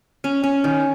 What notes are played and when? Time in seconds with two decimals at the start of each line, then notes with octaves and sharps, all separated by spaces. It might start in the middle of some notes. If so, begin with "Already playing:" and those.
0.24 C#4
0.44 C#4
0.64 D#3